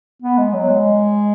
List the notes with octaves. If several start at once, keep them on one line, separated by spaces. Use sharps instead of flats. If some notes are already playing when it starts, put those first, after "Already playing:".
B3
G#3
F#3
G#3